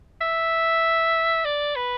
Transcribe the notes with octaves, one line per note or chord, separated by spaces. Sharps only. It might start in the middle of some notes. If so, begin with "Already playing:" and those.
E5
D5
B4